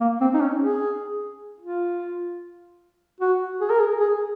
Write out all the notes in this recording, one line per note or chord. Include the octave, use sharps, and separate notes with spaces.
A#3
C4
D#4
C#4
G#4
F4
F#4
G#4
A#4
G#4
G#4